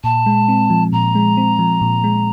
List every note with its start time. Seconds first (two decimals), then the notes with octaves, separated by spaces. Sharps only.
0.04 A#2 A5
0.26 G#3
0.48 C4
0.70 F3
0.92 A#2 A#5
1.15 G#3
1.37 C4
1.59 F3
1.81 A#2
2.04 G#3